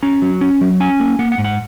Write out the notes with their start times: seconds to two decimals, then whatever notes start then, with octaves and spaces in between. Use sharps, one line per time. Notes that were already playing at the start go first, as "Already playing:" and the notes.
0.03 C#4 A#5
0.22 F#3
0.41 C#4
0.61 F#3
0.80 C#4 G#5
1.00 A#3
1.19 A#3 F#5
1.32 F#5
1.38 G#2
1.44 F#5